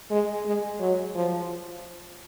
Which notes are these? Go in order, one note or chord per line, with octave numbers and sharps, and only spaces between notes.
G#3
G#3
F#3
F3